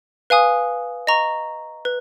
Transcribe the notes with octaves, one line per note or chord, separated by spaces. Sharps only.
B4 F5 G#5 D#6
D#5 A#5 C#6
B4